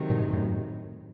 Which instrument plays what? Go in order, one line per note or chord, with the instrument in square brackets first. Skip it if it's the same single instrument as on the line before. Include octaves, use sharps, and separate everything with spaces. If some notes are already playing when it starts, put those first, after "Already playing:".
Already playing: [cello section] C3 D#3 F#3 A3
[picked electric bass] G2 A#2
F#2 A2